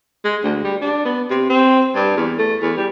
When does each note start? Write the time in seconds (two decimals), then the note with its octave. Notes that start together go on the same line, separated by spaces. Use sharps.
0.24 G#3
0.43 D2
0.64 G3
0.81 D4
1.05 B3
1.30 C3
1.49 C4
1.95 G2
2.16 E2
2.38 A3
2.62 E2
2.77 G3